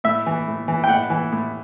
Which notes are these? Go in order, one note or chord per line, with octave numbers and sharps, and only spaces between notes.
A2 E5
E3
A2
E3
G5
A2 F#5
E3
A2